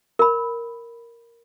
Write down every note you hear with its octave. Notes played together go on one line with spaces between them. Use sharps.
A#4 B5